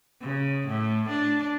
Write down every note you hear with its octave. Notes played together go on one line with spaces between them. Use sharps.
C#3
A2
D4